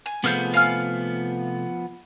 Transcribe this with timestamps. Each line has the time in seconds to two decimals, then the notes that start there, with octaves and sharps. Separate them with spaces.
0.06 G#5
0.24 C3 F3 A3 B3 G#4 F6 G6
0.54 F5 G#5 F6